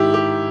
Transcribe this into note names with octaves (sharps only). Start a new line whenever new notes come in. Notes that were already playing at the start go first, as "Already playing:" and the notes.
Already playing: G#2 D#3 E4 G4
G4